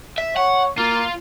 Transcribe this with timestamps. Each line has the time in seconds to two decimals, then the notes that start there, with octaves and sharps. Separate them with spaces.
0.18 E5
0.36 C#5 F#5
0.78 A#3 F4